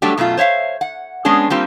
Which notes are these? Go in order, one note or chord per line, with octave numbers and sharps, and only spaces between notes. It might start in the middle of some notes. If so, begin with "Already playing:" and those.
F#3 G3 A3 D4 F#4 G4
F#2 B2 A3 F4
C5 C#5 E5 F5
F#5
G#3 B3 C#4 D4 G#4
G3 A#3 C4 F4 G4